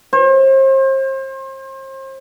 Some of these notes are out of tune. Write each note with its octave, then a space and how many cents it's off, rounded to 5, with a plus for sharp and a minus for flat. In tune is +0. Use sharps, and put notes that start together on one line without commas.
C5 +35